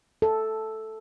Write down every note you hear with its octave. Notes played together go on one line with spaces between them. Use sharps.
A4